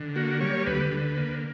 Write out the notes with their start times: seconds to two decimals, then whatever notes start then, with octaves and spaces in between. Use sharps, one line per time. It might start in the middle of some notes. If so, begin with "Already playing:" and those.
Already playing: D3
0.16 A#3 F#4
0.41 G3 C#5
0.66 D2 B4
0.91 D3
1.16 A#3